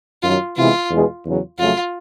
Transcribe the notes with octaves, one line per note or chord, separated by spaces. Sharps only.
F#2 D#3 F#3 F4
C3 E3 G#3 B3 E4 F4
E2 B2 G#3 B3
E2 C#3 F#3
F2 C#3 F#3 A3 F4